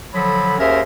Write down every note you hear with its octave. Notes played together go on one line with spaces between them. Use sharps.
D3 F3 F#3 A4 B5
D#2 C#4 G#4 A#4 C5 E5